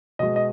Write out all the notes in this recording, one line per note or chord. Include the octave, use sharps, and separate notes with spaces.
B2 G#3 D#5
D#5